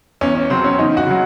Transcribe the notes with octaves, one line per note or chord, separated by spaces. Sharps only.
E2 C#4
C#4
C#3 F#3 C4
C#4
E2 D#4
F#4
C#3 F#3